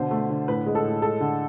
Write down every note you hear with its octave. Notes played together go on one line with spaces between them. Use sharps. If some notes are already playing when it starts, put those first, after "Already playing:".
Already playing: B2 D3 C5
A3
D3
A2 B4
G#3
A4
A2
G#3 A4
D3